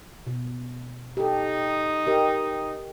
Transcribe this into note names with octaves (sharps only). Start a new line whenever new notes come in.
B2
D#4 G4 A4
G4 A#4 D#5